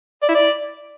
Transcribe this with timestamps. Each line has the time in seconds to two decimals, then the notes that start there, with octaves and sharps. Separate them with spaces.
0.23 D5
0.29 E4
0.35 D5